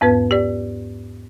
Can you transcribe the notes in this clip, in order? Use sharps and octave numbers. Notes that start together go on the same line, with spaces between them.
E2 G#2 B3 B4
G4 D5